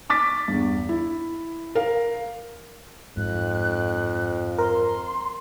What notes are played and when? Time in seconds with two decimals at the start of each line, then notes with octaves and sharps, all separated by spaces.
0.10 C#6 D6 A6 B6
0.48 E2 G2
0.89 E4
1.75 A#4 F5
3.17 F2 G#2 F#6
4.58 A#4 C6